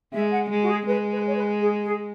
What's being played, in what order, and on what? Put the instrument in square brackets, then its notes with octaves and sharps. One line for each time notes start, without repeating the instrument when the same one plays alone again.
[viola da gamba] G#3 [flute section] E5
[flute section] F#5
[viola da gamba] G#3
[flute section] F#4
G#4
[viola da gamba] G#3 [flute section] B4
[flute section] B4
C#5
B4
G#4
G#4